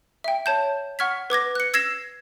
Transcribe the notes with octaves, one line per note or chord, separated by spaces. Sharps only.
E5 G5
C#5 A5 G6
F#5 C#6 F6 G#6 B6
B4 D6 G#6 A#6
F#6 C#7
E6 G#6 A#6 C7 E7